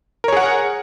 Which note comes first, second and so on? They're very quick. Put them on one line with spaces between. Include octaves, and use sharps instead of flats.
A#4 C#5 G#4 F#5